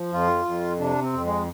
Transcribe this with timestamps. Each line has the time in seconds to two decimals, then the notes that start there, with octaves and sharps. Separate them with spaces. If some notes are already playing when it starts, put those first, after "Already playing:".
Already playing: F3
0.12 F2 F4
0.45 F2
0.79 C3 D4
1.02 C4
1.13 F2
1.25 G#3